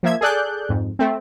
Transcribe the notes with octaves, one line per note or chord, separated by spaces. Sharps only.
F3 A#3 E5 G#6
G#4 A4 D5 F#6 G6
F2 G#2
A3 C4